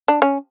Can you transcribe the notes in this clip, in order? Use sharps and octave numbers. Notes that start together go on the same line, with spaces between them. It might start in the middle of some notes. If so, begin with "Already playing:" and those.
D4
C#4